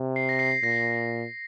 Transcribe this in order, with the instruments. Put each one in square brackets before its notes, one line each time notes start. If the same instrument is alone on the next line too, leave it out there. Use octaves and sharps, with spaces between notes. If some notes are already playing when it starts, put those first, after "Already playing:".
Already playing: [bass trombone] C3
[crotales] C7
A#6
C7
[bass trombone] A#2 [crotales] A#6